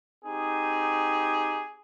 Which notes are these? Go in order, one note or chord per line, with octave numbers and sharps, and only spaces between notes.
C4 D#4 G4 G#4